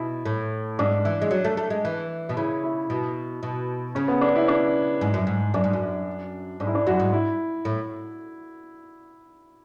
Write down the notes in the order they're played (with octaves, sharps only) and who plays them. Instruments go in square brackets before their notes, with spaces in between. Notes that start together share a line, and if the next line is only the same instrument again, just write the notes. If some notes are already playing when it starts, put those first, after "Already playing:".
Already playing: [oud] B2 [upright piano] E4
[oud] A2
[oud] G#2 [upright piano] D4
[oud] E3
G#3
F#3
A3
A3
G#3
E3
B2
[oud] C#3 [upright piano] E4
[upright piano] E4
[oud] B2
B2
[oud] C#3 [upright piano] C#4
[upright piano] B3
D4
E4
D4
[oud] G#2
F#2
G#2
[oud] F#2 [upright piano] D4
[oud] G#2
F#2
[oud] G#2 [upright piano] D4
[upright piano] E4
D4
[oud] F#2 [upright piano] F#4
[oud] G#2
[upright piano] E4
[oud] A2